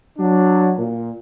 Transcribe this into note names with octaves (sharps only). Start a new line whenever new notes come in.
F#3 D4
A#2